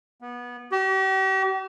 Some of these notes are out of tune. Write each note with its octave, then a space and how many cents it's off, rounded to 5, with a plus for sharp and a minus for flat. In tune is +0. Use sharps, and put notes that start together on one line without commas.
B3 -20
G4 -40